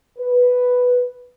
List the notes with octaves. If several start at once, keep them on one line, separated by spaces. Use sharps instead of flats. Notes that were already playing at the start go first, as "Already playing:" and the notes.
B4